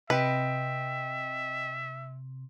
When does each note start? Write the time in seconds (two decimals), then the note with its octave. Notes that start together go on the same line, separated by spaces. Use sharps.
0.10 C3 B4 D#5 E5 G5